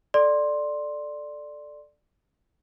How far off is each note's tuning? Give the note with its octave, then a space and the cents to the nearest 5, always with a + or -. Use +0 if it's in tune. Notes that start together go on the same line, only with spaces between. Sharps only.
A4 +0 D5 +10 C6 +5